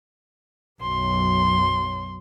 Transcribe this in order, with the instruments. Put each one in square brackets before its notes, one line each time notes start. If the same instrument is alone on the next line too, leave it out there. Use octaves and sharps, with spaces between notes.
[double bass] B1 F#2 [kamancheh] C6